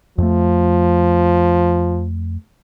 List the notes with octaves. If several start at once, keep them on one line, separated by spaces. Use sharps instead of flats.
F2 F3 A3